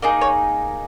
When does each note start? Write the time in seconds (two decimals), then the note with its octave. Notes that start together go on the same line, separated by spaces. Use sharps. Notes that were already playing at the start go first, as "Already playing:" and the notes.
0.02 A#3 D#4 G#4 D#5
0.21 C#5